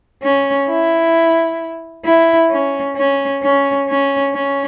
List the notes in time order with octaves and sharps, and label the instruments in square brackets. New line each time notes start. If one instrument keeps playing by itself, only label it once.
[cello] C#4
E4
E4
C#4
C#4
C#4
C#4
C#4